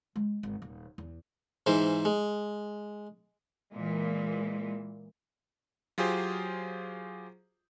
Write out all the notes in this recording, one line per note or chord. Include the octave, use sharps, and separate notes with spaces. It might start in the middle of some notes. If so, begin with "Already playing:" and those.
G#3
G#1
D#1
E2
G#2 E3 C5
G#3
A#2 E3 G#3
F#3 F4 G4 G#4 C5